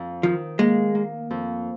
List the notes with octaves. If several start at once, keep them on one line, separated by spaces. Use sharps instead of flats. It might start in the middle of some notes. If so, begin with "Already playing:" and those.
Already playing: F2
D#3 F3
G#3 A#3
A#3
F2